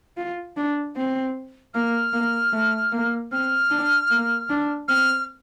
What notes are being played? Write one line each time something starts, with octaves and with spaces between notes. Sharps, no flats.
F4
D4
C4
A#3 F6
A#3
A3
A#3
C4 F6
D4
A#3
D4
C4 F6